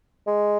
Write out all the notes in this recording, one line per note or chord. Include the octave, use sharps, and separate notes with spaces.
G#3